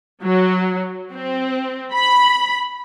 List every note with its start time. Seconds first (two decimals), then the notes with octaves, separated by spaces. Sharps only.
0.22 F#3
1.13 C4
1.93 B5